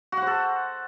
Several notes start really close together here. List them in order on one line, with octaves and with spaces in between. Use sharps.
F#4 F#5 C5 A4